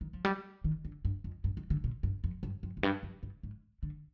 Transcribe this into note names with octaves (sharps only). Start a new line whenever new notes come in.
D#3
F3
G3
D#3
D3
G2
F2
G2
D#3
D3
A#2
G2
F2
G2
F2
F2
G2
F2
G2
G#2
D3